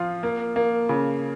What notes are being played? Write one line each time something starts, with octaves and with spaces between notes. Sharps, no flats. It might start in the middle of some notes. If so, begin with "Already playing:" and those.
Already playing: F3 F4
A#3
A#3
C#3